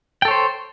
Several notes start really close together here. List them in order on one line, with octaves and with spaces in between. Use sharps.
G5 A4 C#5 C5